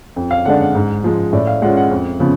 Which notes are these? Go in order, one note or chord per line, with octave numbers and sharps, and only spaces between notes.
F2
F5
D3 G#3 D4 F#5
F#5
G#2
F3 G#3
A2 D5
F5
G#3 C#4 F4 F#5
F#5
F2
C#3 F3 B3